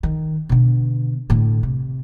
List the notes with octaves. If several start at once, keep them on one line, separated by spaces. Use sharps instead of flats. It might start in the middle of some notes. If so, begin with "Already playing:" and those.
D#3
B2 D3
A2 D3
C3